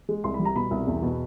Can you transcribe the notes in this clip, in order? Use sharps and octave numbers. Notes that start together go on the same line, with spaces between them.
G#3
C2 C6
B5
G3
A#5
B2 B5
C2
E2
B2